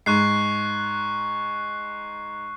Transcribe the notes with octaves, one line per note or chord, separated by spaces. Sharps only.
G#2 C#6 F#6 C7